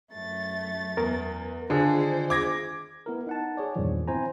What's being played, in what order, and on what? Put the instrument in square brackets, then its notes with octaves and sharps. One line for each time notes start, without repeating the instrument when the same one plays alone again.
[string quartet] F#2 A3 A6
[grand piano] E2 [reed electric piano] A#4
[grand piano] D3 [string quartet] D#3 G#3 C5 [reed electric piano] D4 F4 G#4
[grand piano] D6 G#6 A#6
[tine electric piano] B3 E4 A#4
D#4 F#5 A5
G#4 C#5 D5
E2 G2 A#2 D#3 F3
C4 E4 C5 G#5 A#5